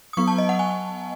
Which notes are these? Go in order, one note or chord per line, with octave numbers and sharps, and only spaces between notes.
D#6
F#3 B3 C#6
A5
D#5
F#5
G#5